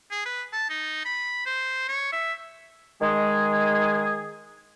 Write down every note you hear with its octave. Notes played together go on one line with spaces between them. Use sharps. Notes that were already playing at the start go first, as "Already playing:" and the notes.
G#4
B4
A5
D#4
B5
C5
C#5
E5
D#3 G#3 G#4